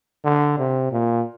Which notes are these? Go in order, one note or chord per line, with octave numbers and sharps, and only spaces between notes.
D3
C3
A#2